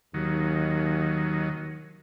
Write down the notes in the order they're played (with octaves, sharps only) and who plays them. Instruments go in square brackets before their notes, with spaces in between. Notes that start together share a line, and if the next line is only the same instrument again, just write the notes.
[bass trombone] D#2 [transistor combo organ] D#3 F#3